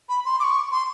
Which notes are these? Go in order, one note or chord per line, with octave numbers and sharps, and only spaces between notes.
B5
C6
D6
C#6
C6